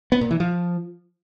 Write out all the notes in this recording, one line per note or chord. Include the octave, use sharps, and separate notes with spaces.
B3
A#2
E3
F3